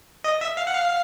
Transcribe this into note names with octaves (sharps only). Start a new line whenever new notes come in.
D#5
E5
F5
F#5
F5